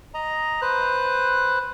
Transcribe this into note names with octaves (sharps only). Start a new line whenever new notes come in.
D#5 A#5
B4 C5 F#6